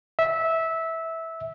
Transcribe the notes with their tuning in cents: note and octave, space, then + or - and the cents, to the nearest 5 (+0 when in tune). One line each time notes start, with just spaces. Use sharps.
E5 -15